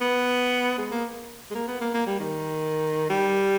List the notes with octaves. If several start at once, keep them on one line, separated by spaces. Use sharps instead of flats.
B3
G#3
A#3
G#3
A#3
B3
A#3
A#3
G3
D#3
G3